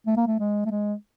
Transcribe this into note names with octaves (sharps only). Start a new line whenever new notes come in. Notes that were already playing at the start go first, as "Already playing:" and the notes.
A3
A#3
A3
G#3
A3
G#3